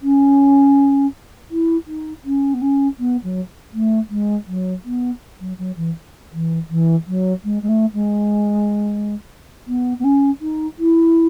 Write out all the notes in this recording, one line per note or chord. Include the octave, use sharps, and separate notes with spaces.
C#4
E4
D#4
C#4
B3
C#4
B3
F#3
A3
G#3
F#3
B3
F#3
F#3
E3
E3
E3
F#3
G#3
G#3
A3
G#3
B3
B3
C#4
D#4
E4